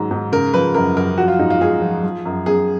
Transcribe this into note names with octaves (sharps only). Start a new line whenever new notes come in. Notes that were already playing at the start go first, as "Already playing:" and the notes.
Already playing: G#2 D#3 F#3
G#2
C#3 A#4
F3 B4
F#2 A#4
F#2 A#4
F3 F#4
F4
G#2 D#4
F4
G#2 G#4
F3
F3
F#2
F#2 G#4